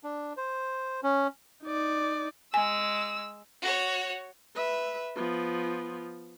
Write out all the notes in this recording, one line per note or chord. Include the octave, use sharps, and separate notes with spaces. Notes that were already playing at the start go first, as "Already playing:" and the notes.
D4
C5
C#4
D#4 D5
G#3 G#5 E6
F#4 C#5
B4 E5
F3 B3